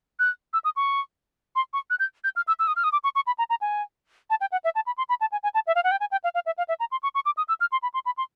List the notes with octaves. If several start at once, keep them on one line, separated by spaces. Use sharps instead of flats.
F#6
E6
D#6
C#6
C6
C#6
F#6
G6
G6
F6
E6
E6
D#6
F6
D#6
D6
C#6
C#6
B5
A#5
A#5
G#5
A5
G5
F#5
E5
A5
B5
C6
B5
A5
G#5
G#5
A5
E5
F5
F#5
G5
G#5
G5
F5
F5
E5
F5
E5
A#5
C6
C#6
C#6
D6
D#6
E6
F6
C6
B5
C6
B5
C6